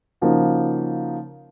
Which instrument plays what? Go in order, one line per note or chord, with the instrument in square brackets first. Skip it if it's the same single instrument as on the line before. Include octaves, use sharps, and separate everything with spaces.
[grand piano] C#3 F3 A#3 D#4 F#4